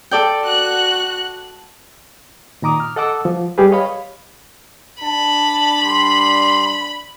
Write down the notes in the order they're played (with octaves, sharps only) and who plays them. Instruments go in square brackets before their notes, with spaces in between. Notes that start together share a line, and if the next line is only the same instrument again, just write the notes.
[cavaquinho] A4 D5 G5
[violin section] F#4 F#6
[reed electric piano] A#2 D#3 A#5 D6 D#6
F6
A4 D#5 F#5 A5 D6 E6
F3
G3 G4 G#4 B4
C#5 D#5 F5 B5
[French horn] D4 [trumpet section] A5 [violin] B5
[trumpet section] G3 C6